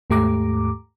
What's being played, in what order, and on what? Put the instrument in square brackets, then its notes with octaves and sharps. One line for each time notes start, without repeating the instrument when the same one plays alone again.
[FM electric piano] D#2 G#2 A3 G4 A#5 D6